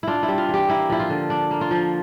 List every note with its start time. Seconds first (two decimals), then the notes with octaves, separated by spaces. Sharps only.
0.03 D4 E4 F4
0.23 E4
0.28 G3
0.38 F4
0.49 E3
0.54 G4
0.69 A#3 E4
0.90 F3 E4
1.00 F4
1.10 D3
1.30 D4
1.51 A#3
1.61 F4
1.71 F3